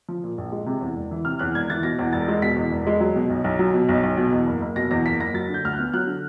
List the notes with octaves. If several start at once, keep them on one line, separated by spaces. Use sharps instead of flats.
F3
A#2
A#1
G#3
C3
E2
E1
E3
C3 F6
E2 F#6
E1 G#6
E3 A6
B2 A#6
E2
E1 A6
G#3
B2 B6
E2
E1
G#3
F#3
B2
B1
B1
F#3
B2
B1
B1
B2
E2
F#1
F#1
B2 A#6
E2 A#6
F#1 B6
F#1 A#6
F#3 A6
D3 G6
D2 F6
F#6
B3
F#3 F#6
D3